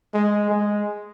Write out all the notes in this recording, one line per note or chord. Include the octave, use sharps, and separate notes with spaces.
G#3
G#3